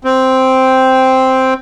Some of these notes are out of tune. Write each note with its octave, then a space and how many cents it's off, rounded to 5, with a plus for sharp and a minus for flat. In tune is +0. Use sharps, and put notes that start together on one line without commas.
C4 +0 G5 +0